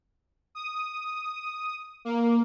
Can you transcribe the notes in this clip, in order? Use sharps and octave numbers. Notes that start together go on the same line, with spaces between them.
D#6
A#3